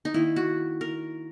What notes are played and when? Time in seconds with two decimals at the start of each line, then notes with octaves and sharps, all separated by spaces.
0.05 D#4
0.14 D#3 A#3 E4
0.36 F#4
0.81 A#4